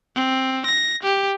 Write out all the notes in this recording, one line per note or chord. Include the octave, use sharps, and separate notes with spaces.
C4
A#6
G4